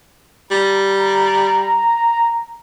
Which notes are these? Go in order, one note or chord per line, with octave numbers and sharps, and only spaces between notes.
G3 A#5